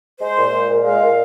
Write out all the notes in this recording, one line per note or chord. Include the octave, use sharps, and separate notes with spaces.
G#3 C5
A#2
G#3
A#2
G#3 F5
A#2